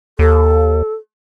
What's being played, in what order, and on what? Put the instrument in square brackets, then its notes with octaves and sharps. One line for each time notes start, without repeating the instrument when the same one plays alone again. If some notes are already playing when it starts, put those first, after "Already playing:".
[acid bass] D#2 [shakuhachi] A4